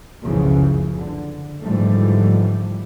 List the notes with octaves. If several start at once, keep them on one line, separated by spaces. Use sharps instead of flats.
F1 C#2 F#2 C#3 E3 F3
D3
G#2 D3 E3 F3 G3 A3